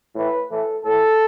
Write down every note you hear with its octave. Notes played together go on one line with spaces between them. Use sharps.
A2 E3 B4
A2 E3 A4
A2 A4
E3